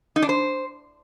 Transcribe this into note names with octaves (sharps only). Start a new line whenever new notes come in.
D#4
D4
C5